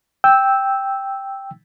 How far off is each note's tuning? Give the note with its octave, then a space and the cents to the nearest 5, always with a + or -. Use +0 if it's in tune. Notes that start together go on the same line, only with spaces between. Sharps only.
G5 +0 E6 -5